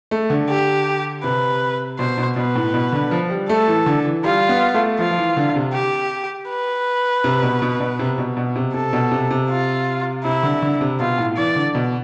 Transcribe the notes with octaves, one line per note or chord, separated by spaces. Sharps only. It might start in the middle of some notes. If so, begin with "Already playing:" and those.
A3
D3
G4
C3 B4
B2 C5
B2
B2 B4
A2
B2
D3
F3
G3
A3 A4
E3
D3
E3
G3 F4
B3
A3
F3 F4
F3
E3
D3
C3
G4
B4
C3
B2
B2
B2
C3
B2
B2
C3
C3 A4
B2
C3
C3
F4
C3 E4
D3
D3
C3
B2 F4
A2
E3 D5
D3
B2